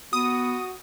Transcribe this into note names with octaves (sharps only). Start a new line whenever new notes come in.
B3 F#4 D#6